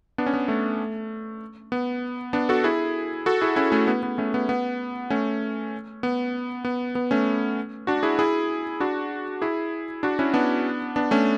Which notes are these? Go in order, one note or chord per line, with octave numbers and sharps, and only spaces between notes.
B3 D4
C#4
B3
A3
B3
B3 D4
F#4 A4
E4 G#4
F#4 A4
E4 G#4
C#4 E4
A3 C#4
B3
B3
A3 C#4
B3
B3
A3 C#4
B3
B3
B3
A3 C#4
D4 F#4
E4 G#4
E4 G#4
D4 F#4
E4 G#4
D4 F#4
C#4 E4
B3 D4
B3 D4
A3 C#4